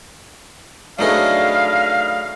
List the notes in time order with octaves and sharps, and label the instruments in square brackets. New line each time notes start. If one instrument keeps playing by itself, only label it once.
[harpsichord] F#3 A3 G#4 [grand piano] D4 D#4 B4 [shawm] F5